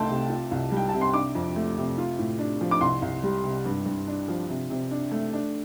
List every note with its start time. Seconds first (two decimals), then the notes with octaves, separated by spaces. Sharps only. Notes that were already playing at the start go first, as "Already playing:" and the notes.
Already playing: C2 A3 G5 A5 C6
0.10 C3
0.29 F4
0.51 C2
0.71 G3
0.77 G5
0.89 C3 A5
1.01 C6
1.14 D4 D6
1.35 F2
1.56 A3
1.76 C3
1.98 F4
2.19 A2
2.39 D4
2.61 F3
2.71 D6
2.81 C2 C6
3.02 C2
3.23 G3
3.44 C3
3.65 G2
3.86 G2
4.07 D4
4.28 F3
4.49 C3
4.70 C3
4.91 D4
5.11 A3
5.33 D4